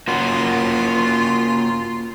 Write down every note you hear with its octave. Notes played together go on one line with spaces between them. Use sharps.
A#3 C#4 F4 F#4